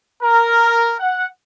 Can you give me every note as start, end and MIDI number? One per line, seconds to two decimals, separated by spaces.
0.21 0.93 70
0.99 1.26 78